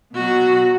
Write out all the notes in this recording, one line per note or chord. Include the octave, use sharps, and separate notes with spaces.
B2 F#3 F#4